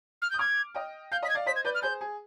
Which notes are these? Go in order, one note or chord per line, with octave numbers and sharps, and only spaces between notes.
F6
G6
D#6
D6 F6 G#6
D#5 G5
F5 G6
D#5 B6
G#6
D5 F5
C5 D#5 B6
G#6
B4 D5 G6
F6
G#4 C5 G6
G#4